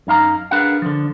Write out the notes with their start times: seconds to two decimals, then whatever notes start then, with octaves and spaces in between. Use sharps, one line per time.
0.07 F#2 D#4 F5 A#5
0.51 D4 G#4 A#4 B4 F5 F#5
0.82 D3 F3